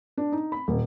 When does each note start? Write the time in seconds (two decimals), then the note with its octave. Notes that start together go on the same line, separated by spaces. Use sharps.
0.18 D4
0.32 D#4
0.52 B5
0.68 D#1